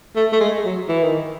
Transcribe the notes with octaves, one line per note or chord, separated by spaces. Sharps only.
A3
A3
G#3
F#3
E3
D#3